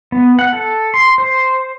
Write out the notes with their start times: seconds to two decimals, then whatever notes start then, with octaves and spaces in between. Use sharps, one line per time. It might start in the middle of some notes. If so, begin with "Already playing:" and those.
0.12 B3
0.39 F#5
0.53 A4
0.94 C6
1.18 C5